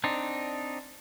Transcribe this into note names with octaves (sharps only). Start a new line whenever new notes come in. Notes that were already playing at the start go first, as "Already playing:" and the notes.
C4 D4 D#4